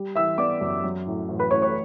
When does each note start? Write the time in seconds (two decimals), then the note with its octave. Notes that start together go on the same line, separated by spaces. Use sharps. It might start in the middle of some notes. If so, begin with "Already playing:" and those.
Already playing: G3
0.16 E3 E5 E6
0.38 B3 D5 D6
0.61 F#2
0.84 F#3
1.07 A2
1.28 A1
1.39 B4 B5
1.51 A1 C#5 C#6
1.62 C#5 C#6